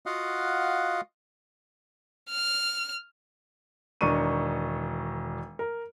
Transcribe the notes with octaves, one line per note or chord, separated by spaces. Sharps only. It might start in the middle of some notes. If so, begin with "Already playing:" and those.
F4 F#4 D#5 F5 F#5
F6
E1 D#3 D4 C#6 D#7
A#4